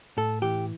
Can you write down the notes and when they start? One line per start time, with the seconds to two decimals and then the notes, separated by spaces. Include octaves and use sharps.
0.17 A2 A4
0.42 E3 G4